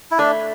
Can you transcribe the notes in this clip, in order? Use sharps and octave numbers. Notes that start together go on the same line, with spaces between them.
E4
A3 D4